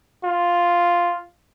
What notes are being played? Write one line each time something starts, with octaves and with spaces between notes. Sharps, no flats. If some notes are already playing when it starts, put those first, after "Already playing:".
F4